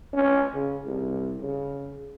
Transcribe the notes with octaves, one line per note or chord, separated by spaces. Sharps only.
C#4
C#3
C2
C#3